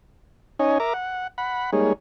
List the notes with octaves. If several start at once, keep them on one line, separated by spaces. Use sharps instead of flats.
C#4 D#4 C#5 D#5 G#5
A#4 E5 A#5 D6
F#5
F#5 B5
G3 G#3 A#3 D#4 G#4 C#5